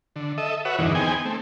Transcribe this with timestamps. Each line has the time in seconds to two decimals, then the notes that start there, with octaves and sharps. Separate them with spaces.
0.16 D3
0.38 A4 D#5 E5
0.65 F#4 B4 C#5 E5 F#5
0.78 E2 G2 A#2 D3 E3 D#4
0.95 B3 C4 D#4 G#4 G5 G#5
1.25 A3 C4